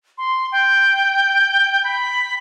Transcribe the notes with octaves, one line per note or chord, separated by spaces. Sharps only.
C6
G5
B5